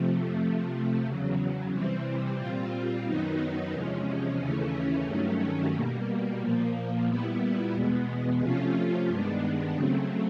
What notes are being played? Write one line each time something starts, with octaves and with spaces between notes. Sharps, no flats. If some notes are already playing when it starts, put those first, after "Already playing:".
Already playing: F2 C3 F3 A3
C3 F3 A3
E2 C#3 F#3
C3 E3 G3 C4
A#2 G3 C4 F4
F#2 D#3 F#3 B3 D#4
E2 C3 F3 G#3 C#4
D#2 C#3 E3 A3 C#4
G2 D#3 F#3 A3 C#4
B2 G3 A#3
A#2 F3 A#3
A#2 G3 B3 E4
E2 B2 G#3 B3
C3 F3 A3 C#4 F4
G2 D#3 G#3 B3 D4
C#3 F#3 A3 C4